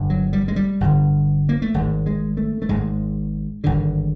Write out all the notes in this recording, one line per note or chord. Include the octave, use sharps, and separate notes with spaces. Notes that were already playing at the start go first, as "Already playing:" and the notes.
Already playing: G1 G2 D3
F#3
G3
G#3
G3
G1 G2 D3
A#3
A3
G#1 G#2 G#3
G#3
A3
A3
G#1 G#2 G#3
G#1 G2 D3